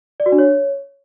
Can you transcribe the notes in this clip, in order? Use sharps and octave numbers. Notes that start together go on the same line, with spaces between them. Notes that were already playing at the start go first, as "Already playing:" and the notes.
D5
F#4
D4
C#5